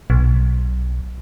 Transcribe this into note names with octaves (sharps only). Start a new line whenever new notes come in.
B1